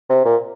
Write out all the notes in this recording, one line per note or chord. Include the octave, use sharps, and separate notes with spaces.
C3
A#2